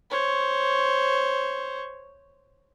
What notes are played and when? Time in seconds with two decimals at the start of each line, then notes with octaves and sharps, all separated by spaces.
0.10 C5 C#5